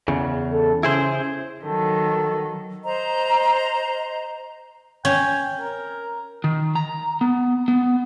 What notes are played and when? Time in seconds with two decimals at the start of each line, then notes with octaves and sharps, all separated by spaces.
0.08 E2 C#3
0.51 A4
0.83 C#3 E4 G#4 C5
1.63 D#3 F#3 A4
2.83 C5 D#5 A#5
5.05 C#4 G5
5.59 A#4
6.44 D#3
6.75 A#5
7.21 B3
7.68 B3